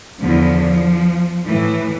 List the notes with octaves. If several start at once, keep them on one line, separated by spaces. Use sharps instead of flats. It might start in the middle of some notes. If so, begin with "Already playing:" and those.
E2 D3 F3
A2 E3